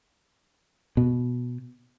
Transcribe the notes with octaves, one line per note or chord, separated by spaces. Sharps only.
B2